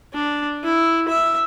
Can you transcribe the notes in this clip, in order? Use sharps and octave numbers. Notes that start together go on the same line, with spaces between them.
D4
E4
E5